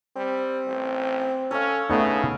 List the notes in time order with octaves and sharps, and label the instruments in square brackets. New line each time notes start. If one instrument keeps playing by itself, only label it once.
[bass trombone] G3 [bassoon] C4
[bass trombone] A1
[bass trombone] C#4 [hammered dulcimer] A4 C#5 F5
[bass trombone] C#3 [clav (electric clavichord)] A3 B3 D#4 [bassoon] C#4